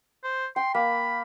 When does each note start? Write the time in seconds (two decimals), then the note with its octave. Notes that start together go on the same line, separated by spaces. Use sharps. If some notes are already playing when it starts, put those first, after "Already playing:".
0.24 C5
0.56 G5 C6
0.74 A#3 B5